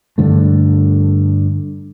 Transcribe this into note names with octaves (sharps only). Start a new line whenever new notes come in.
G2 D3 A3